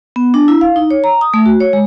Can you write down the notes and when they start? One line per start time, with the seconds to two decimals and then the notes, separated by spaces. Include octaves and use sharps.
0.16 B3
0.34 D4
0.48 E4
0.61 F5
0.76 D#4
0.91 C#5
1.04 A#5
1.21 D#6
1.34 A3
1.46 F#4
1.60 C#5
1.73 G#3